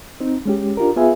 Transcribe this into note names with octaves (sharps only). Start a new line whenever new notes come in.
C4 D#4
G#3 C#4 G4
D4 F4 G4 A#4
B3 F4 G#4 B4 E5 G#5